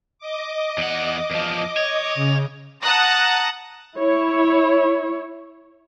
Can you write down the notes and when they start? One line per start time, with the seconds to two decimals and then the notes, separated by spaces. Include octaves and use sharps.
0.19 D#5 D6
0.78 E2 F#5
1.31 E2 F3
1.77 C#5
2.15 C#3
2.82 F#5 A5 A#5 D#6 F#6 A#6
3.98 E4 C#5